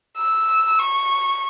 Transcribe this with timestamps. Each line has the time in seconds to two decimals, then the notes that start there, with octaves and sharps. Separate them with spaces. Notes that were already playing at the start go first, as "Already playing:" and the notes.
0.18 E6
0.79 C#6